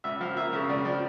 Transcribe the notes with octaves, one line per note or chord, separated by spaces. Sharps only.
C#2 E5
F3 F5
A#3 E5
C#3 E5
C#2 D5
F3 D5